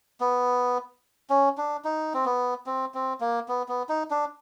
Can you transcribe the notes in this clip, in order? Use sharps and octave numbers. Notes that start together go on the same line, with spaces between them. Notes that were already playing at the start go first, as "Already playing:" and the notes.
B3
C#4
D4
D#4
C4
B3
C4
C4
A#3
B3
B3
D#4
D4